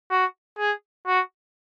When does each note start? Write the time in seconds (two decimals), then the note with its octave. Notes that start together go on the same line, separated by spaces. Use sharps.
0.11 F#4
0.58 G#4
1.07 F#4